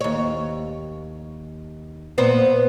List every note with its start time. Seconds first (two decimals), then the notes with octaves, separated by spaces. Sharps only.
0.01 D#2 C#5
2.18 A#2 B3 C5